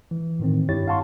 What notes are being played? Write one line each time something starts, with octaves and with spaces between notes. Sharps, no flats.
E3
A2 D#3 C4
G2 E4 G4 C#5 A6
F5 F#5 A5 C6 C#6